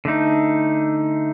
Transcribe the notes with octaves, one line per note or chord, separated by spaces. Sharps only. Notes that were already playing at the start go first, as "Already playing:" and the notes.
D3 A3 D#4